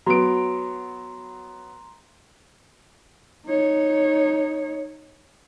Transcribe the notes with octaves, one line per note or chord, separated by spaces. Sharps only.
F#3 B3 A#5 C6 D7
D#4 C#5